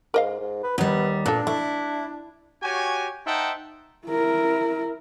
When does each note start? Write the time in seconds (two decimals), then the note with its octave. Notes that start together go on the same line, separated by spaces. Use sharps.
0.14 G#2 A#4 D#5 F5
0.40 G#2
0.63 B4
0.78 D#2 G3 B3
1.26 A#2 B3 D4 A4
1.47 A3 E4
2.63 F#4 G4 C#5 G#5
3.27 D#4 C5 E5 F#5 G5 A5
4.07 E4 A#4